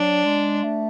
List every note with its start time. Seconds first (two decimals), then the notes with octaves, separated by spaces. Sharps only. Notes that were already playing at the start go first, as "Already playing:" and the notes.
Already playing: F#3 D4
0.25 G#3
0.64 A3